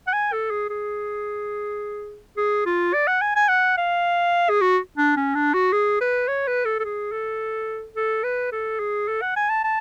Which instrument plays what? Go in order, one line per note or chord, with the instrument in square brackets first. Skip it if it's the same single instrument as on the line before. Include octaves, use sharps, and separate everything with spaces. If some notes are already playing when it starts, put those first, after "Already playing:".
[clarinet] F#5
G#5
A4
G#4
G#4
G#4
F4
D5
F#5
G#5
G#5
F#5
F5
G#4
F#4
D4
C#4
D4
F#4
G#4
B4
C#5
B4
A4
A4
G#4
A4
A4
B4
A4
G#4
A4
F#5
G#5
A5
A5